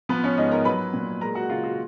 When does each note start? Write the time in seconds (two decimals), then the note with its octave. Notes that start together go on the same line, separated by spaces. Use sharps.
0.09 F3 B3 B4
0.24 C#4 C#5
0.37 G#2 D#4 D#5
0.51 A#4 A#5
0.65 F#3 B4 B5
0.94 A#2
1.21 G#3 A#4 A#5
1.35 F#4 F#5
1.50 C#3 F4 F5
1.64 F#4